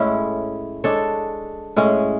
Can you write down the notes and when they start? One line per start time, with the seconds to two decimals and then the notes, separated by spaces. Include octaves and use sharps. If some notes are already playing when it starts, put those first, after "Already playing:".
Already playing: A2 G#3 C#4 E4
0.84 G#3 D4 A4 C#5
1.76 A2 G#3 C#4